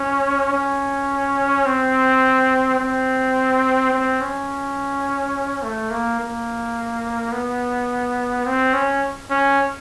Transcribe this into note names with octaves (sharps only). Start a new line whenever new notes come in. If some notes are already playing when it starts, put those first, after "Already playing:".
Already playing: C#4
C#4
C4
C4
C4
C#4
A3
A#3
A#3
B3
C4
C#4
C#4